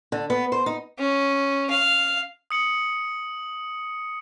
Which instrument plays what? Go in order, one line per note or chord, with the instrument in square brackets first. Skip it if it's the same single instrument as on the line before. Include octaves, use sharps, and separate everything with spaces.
[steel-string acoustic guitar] D3
B3
C5
D#4
[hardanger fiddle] C#4
F5
[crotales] D#6 C#7 F#7